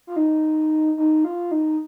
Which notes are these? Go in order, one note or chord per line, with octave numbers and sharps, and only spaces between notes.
F4
D#4
D#4
F4
D#4